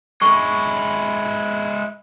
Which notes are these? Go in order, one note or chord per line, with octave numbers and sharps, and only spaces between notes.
G#3 E4 C#6